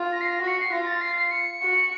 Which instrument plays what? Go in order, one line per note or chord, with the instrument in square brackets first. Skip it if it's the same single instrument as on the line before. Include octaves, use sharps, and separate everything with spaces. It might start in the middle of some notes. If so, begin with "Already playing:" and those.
Already playing: [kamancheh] F4
[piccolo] A#6
C7
A#6
[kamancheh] F#4
[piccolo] C#7
C7
[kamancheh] F4 [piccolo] A#6
[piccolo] A6
C7
C7
C#7
[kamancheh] F#4